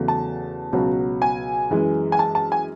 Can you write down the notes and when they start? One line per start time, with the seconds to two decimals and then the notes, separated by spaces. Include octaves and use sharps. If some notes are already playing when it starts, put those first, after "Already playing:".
Already playing: E2 C#3 F#3 A3
0.08 A5
0.73 C#2 B2 F#3
1.22 G#5
1.70 F#2 E3 G#3
2.12 G#5
2.19 A5
2.35 A5
2.52 G#5